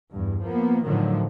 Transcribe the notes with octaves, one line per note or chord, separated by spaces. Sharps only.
E2 G2
F3 A#3 B3
A2 D3 D#3 F3 F#3